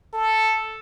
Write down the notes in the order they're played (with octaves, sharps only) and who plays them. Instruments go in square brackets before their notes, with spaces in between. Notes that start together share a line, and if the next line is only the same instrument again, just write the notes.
[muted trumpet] A4